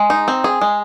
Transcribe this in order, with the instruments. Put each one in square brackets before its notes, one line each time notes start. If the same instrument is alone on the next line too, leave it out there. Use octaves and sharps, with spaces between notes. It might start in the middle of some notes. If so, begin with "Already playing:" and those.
Already playing: [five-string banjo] G#3
D#4
C4
G#4
G#3